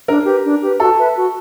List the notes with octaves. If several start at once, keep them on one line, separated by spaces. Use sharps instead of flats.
D4 A#4
G4 B4
D4
G4 B4
F#4 A4
B4 E5 A5
F#4